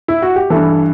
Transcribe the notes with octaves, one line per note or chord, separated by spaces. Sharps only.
E4
F#4
G4
G2 E3 A4